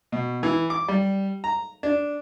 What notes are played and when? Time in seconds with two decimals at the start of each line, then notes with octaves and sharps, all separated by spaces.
0.12 B2
0.43 E3
0.70 D6
0.88 G3
1.44 A#5
1.83 D4